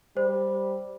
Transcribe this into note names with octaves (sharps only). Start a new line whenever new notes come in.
G3 C5